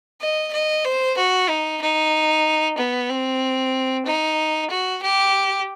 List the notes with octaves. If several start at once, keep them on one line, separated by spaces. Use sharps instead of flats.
D#5
D#5
C5
F#4
D#4
D#4
B3
C4
D#4
F#4
G4